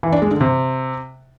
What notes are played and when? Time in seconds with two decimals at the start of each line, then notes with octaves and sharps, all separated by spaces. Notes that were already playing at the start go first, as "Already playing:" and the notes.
0.03 E3
0.12 D4
0.22 G#3
0.31 D3
0.41 C3